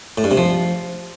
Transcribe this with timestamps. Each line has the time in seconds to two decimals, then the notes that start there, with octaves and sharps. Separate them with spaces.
0.18 A2
0.24 G2
0.31 C3
0.38 F3